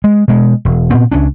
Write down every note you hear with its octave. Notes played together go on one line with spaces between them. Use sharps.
G#3
B2 G#3
E1
A#2 B3 C4
C#2 C#4 D4